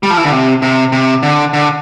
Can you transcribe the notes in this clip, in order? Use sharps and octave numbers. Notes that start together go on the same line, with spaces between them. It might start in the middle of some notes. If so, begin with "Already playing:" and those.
G3
F3
E3
D3
C3
C3
C3
D3
D3